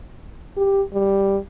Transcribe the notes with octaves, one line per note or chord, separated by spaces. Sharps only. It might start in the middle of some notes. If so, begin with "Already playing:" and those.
G4
G3